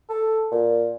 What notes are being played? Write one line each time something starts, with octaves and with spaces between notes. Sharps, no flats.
A4
A#2